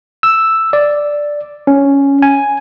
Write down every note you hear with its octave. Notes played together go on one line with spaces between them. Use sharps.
E6
D5
C#4
G#5